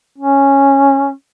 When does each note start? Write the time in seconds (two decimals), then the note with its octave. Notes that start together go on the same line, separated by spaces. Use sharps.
0.18 C#4